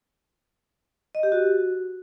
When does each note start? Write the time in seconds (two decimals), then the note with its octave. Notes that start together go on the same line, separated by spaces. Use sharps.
1.15 D#5
1.23 G4
1.32 F#4